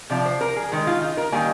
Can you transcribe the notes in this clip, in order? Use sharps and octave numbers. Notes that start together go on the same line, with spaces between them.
C3 F3 D5
C5
A#4
G#4
D#3 G#3
F4
D#4
A#4
D#3 G3 A#3 G#5